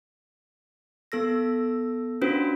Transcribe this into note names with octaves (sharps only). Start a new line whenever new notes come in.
B3 A4 E6 A#6
C#4 D4 F4 F#4 B4 C5